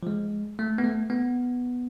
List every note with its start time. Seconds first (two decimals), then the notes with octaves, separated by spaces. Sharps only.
0.03 F3
0.07 G#3
0.59 A3
0.78 B3
0.84 A3
1.10 B3